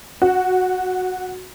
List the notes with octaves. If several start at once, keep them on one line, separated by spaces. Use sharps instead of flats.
F#4